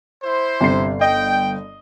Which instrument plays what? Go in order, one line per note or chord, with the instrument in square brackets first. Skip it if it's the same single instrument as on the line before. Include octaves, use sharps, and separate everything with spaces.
[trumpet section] E4 C5
[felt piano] G1 C7 [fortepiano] C3
[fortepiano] D#5 [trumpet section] G5